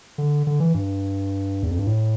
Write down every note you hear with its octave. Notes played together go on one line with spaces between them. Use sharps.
D3
D3
E3
G2
E2
F2
G2
A2